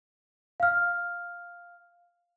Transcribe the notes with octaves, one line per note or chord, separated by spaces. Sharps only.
F5 F6